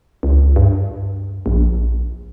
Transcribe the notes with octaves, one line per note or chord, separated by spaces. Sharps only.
C#2
G2
A#1